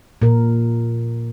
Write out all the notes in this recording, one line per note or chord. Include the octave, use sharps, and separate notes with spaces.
A#2 A#4